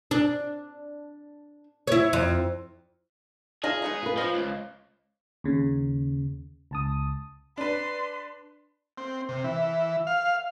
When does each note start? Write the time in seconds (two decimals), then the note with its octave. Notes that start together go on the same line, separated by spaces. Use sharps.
0.11 D4
1.87 E4 C#5
2.13 F2
3.64 E4 F4 G#4 D#5
3.82 G#3 B3 D#4
4.03 F4 B4
4.18 F3 C5 D#5
4.34 C#2
5.44 D#2 C#3
6.71 C#2 A5 D#6
7.58 D4 B4 C6
8.98 C4
9.29 C3
9.44 E3
10.07 F5